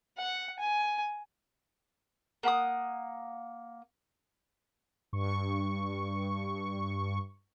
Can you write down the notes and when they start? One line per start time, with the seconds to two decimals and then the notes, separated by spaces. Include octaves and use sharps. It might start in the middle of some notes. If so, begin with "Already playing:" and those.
0.18 F#5
0.59 G#5
2.43 A#3 F#5 B5 D#6
5.13 G2 C#6